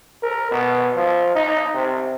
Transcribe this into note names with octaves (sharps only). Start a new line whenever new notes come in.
A#4
B2
F3
D#4
C3